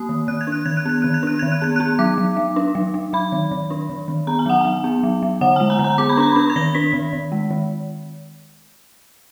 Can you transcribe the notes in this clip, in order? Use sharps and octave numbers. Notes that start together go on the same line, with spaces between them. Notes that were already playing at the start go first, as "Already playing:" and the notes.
Already playing: A#3 D#6
D#3
D#3 F#6
G#6
D4
F#6
D#3 G#6
F#6
B3 G#6
D#3 F#6
G#6
D4 F#6
D#3 G#6
F#6
B3 G#6
B3 F#6
F#3 D6
F#3
F#3
D4
F#3
F#3
F#3 B5
D#3
D#3
D4
D#3
D#3
B3 A#5
G#5
F#3 F#5
F#3 G#5
B3
F#3
F#3
D3 F#5
G#3 G#5
A#5
D3
A#5
B3 D6
B5
D4 A#5
D4 B5
G#6
D#3 A#6
D4 B6
D#3
D#3
G#3
D#3